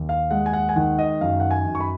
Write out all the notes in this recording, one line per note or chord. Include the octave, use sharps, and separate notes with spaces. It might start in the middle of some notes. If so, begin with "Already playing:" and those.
Already playing: D#2
F5
G#3 F#5
G#5
F#5
G#5
D#3 F#5
D#5
F#2 F5
F#5
G#5
F#2
C#6
B5